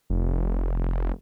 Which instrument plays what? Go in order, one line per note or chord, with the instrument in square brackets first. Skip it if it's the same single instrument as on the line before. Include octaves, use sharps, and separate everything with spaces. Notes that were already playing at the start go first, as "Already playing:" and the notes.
[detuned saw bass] F1